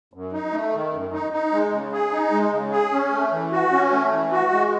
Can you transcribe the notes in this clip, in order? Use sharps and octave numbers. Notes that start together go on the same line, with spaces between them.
F#2
D#4
A3
D#3
F#2
D#4
D#4
G#3
C#3
G#4
D#4
G#3
C#3
G#4
C#4
A3
E3
F#4
C#4
A3
E3
F#4
G#3